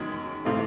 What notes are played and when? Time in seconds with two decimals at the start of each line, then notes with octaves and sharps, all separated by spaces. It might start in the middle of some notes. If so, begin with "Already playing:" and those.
Already playing: F#2 D#3 G#3 C#4
0.45 C3 E3 A3 F5